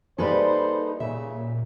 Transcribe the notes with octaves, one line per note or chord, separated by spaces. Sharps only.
G3 A#3 D#4 G#4 A4 B4 C5
A#2 C#3 E5